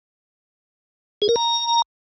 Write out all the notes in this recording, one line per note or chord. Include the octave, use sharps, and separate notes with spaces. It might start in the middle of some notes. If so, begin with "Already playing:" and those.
G#4
A#4
A#5